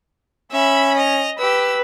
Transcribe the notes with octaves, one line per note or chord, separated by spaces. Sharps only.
C#4 E5 B5
D#5 F7
G4 B4 E6